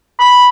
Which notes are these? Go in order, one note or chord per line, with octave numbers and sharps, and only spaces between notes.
B5